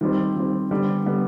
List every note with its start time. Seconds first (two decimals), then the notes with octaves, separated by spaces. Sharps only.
0.01 D#3 G3 C4
0.36 D#3 G3 C4
0.71 D3 G3 B3
1.06 D3 G3 B3